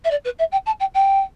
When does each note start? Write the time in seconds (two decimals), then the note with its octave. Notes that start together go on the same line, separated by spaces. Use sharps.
0.04 E5
0.11 D5
0.25 B4
0.39 E5
0.52 G5
0.66 A5
0.80 G5
0.94 G5